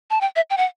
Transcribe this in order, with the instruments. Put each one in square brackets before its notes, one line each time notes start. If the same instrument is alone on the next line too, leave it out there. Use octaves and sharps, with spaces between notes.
[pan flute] A5
G5
E5
G5
F#5